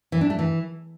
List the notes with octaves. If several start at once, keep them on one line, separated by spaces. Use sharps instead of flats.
E3
D4
A3
E3